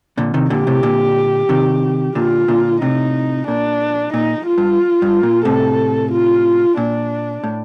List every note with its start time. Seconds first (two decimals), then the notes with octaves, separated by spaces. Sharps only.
0.17 A#2 D3
0.34 C3 D#3
0.50 A#2 D3 G4
0.67 A2 C3
0.83 A#2 D3
1.49 C3 D#3
2.15 A#2 D3 F4
2.48 A#2 D3
2.82 A2 C3 D#4
3.47 A#2 D4
4.13 A#2 D#4
4.46 F4
4.58 G2
5.02 G2
5.23 A#2
5.45 A2 C3 A4
6.12 F4
6.77 A#2 D4
7.44 A2